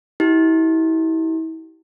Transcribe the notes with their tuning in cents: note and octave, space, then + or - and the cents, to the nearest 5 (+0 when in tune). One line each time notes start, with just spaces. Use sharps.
E4 -35 G4 -35